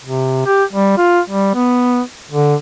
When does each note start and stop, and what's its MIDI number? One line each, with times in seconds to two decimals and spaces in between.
0.03 0.45 48
0.46 0.64 67
0.73 0.94 55
0.97 1.20 65
1.30 1.54 55
1.55 2.01 59
2.31 2.55 50